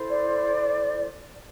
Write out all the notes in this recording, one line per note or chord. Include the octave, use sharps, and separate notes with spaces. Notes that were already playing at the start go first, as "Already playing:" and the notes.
Already playing: E4 A4 C5
D5